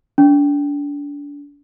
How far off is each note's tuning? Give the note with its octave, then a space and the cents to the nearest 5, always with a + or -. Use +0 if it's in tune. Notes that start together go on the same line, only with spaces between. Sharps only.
D4 -30